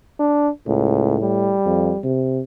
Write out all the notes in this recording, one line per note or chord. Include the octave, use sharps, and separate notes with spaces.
D4
C#2 A2
G3
F2
C3